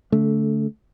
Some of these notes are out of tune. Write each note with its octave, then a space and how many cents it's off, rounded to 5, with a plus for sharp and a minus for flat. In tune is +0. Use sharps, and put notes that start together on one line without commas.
D3 -35 A3 -10